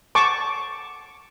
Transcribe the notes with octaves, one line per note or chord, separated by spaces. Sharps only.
A5 C#6 D6